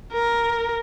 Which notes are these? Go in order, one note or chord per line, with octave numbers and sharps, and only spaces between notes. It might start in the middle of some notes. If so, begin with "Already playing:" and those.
A#4